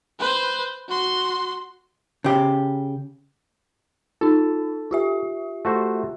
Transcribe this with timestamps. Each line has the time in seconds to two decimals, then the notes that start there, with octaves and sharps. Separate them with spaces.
0.19 B4 C5
0.88 F#4 C6
2.24 C#3 G4
4.21 D#4 F4 A4
4.91 F4 G4 E5
5.65 A3 F#4 C5